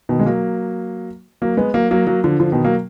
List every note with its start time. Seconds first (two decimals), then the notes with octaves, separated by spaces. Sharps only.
0.09 B2 D#3
0.20 G#3
0.26 F#3 A#3
1.42 F#3 A#3
1.57 G#3 B3
1.74 F#3 A#3
1.91 F#3 A#3
2.07 F#3 A#3
2.24 D3 F3
2.40 D3 F3
2.52 B2 D#3
2.65 F#3 A#3